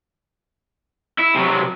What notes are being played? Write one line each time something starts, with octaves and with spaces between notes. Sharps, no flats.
E4
C3 F#3